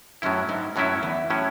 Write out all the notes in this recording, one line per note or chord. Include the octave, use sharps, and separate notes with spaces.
F#2 A2 F#3 C#4 E4
G#2
F#2 A2 F#3 C#4 E4
E2
A2 F#3 C#4 E4